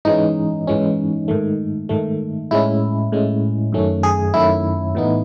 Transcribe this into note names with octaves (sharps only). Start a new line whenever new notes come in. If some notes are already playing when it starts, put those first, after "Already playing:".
G#2 E3 G#3 C#4 D#4
G#2 E3 G#3 C#4
G#2 D#3 A3
G#2 D#3 A3
A2 G#3 C#4 E4
A2 G#3 C#4
F#2 D#3 A3 C#4
G#4
F#2 D#3 A3 C#4 E4
A2 E3 B3 D#4